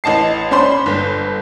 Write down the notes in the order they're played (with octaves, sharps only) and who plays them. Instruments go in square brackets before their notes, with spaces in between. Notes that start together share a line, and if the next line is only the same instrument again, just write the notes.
[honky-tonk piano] A1 D#5 A5 C7
C#4 D4 C5 B5 C6
G1